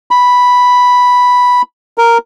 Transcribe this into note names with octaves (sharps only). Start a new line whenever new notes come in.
B5
A#4